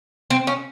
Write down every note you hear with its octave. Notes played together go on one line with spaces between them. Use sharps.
C4
C#4